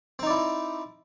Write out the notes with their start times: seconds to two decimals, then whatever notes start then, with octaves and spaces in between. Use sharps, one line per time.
0.19 C4
0.23 D#4
0.27 D5
0.30 E4